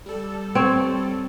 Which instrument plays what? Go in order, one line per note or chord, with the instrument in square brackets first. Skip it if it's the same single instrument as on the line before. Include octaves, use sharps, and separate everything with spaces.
[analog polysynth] G3 A4
[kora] C4 C#5